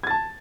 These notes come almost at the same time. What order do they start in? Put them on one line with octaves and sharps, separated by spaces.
G#6 A6 A5